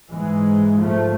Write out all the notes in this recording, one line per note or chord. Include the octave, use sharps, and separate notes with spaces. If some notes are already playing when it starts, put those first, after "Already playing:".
G#2 E3 G#3
F3 A3